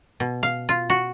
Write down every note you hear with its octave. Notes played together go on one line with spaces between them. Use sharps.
B2
F5
F4
F#4